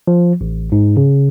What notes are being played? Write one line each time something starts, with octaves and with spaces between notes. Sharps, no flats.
F3
A1
G#2
C#3